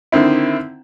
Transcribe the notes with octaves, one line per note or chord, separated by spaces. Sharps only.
D3 D#3 C4 E4